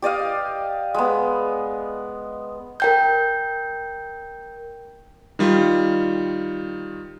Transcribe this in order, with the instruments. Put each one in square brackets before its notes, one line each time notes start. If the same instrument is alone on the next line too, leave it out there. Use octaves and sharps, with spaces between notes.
[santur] G4 D5 D#5 F5
G#3 B3
[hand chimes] A#4 G5 G6
[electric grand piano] D#3 G3 F4